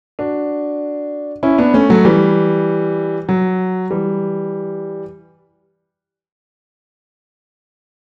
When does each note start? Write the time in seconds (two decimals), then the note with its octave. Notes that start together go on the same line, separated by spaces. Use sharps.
0.19 D4 F#4
1.43 C#4 E4
1.58 B3 D4
1.74 A3 C#4
1.90 F#3 A3
2.05 E3 G3
3.29 F#3
3.91 E3 G3